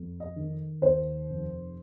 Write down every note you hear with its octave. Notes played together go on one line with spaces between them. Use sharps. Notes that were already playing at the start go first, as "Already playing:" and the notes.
Already playing: F2
D#5
D#3
D#2 C5
F1